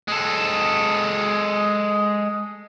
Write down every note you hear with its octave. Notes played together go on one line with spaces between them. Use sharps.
G#3 A4